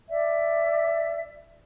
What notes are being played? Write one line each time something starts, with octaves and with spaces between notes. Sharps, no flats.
D5 E5